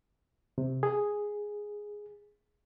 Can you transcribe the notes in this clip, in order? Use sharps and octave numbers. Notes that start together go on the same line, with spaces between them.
C3
G#4